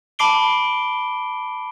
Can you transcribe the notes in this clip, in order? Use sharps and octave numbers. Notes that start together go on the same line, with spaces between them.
A5 B5 D6 C7 D7 G7